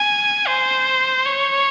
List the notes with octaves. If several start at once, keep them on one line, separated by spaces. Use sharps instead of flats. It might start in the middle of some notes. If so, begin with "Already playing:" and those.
Already playing: G#5
C5
C#5